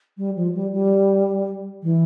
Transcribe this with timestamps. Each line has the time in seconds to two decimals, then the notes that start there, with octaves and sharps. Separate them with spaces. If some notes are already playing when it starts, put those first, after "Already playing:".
0.17 G3
0.36 F3
0.54 G3
0.72 G3
1.83 E3